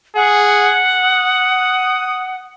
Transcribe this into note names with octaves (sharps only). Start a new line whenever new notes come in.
G#4 F#5
D#6